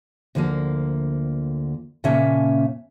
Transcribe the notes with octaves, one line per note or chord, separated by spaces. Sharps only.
D2 D3 F3 G#3 A#3
A#2 C#3 A#3 C#4 E5 A5